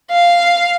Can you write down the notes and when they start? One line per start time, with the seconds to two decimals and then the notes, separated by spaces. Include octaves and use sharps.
0.11 F5